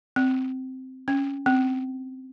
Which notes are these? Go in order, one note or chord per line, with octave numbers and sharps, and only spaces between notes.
C4
C#4
C4